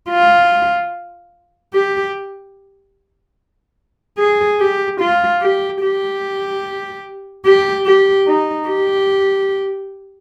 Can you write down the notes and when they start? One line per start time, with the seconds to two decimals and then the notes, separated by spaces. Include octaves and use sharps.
0.10 F4
1.74 G4
4.18 G#4
4.60 G4
5.00 F4
5.42 G4
5.82 G4
7.45 G4
7.86 G4
8.27 D#4
8.68 G4